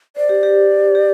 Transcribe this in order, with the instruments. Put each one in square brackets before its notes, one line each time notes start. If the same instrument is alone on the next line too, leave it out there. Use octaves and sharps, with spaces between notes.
[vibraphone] C5 [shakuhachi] D5
[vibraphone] G4
G4
G4